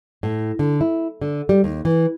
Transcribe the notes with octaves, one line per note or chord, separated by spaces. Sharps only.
A2
D3
E4
D3
G3
D#2
E3